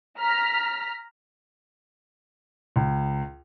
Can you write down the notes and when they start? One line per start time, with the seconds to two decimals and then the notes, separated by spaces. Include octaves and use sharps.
0.19 A#5 F6 B6
2.76 C#2